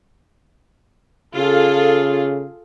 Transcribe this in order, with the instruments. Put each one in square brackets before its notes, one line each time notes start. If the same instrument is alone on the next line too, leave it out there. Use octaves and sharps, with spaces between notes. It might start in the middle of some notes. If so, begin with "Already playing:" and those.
[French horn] C#3 [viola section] F4 G#4 A4